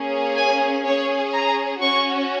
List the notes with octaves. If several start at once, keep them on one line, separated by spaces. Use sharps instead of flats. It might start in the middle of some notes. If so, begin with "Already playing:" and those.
Already playing: A#3 C#4 G#4
G#5
C#4 G#4 C#5
A#5
C#4 F#4 C#6